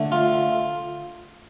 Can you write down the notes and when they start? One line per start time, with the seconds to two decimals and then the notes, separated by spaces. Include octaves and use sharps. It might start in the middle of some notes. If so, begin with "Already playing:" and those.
Already playing: D3 A3
0.12 F4